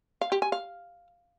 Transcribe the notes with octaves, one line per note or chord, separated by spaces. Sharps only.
F5
G4
G#5
F5